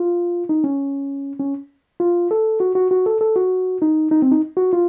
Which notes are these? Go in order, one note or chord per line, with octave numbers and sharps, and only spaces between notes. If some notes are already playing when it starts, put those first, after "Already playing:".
Already playing: F4
D#4
C#4
C#4
F4
A4
F#4
F#4
F#4
A4
A4
F#4
D#4
D#4
C4
D#4
F#4
F4